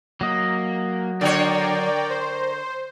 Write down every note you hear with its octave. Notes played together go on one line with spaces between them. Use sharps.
F#3 A#3 D#5
D3 A#4 C#5 D5 G5 A#5
C5